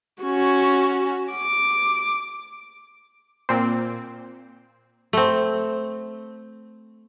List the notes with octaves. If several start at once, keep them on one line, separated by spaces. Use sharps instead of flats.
C#4 F#4
D6
A#2 C4
A3 C4